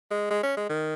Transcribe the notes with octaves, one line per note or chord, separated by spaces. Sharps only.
G#3
G#3
C#4
G#3
D#3